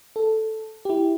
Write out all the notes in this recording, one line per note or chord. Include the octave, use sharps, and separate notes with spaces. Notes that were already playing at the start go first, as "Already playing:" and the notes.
A4
E4 G4